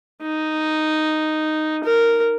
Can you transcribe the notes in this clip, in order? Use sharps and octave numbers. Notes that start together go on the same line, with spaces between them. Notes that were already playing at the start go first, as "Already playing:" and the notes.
D#4
A#4